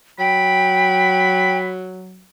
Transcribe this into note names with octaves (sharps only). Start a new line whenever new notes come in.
F#3 G5 B5